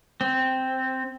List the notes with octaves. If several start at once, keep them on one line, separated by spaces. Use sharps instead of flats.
C4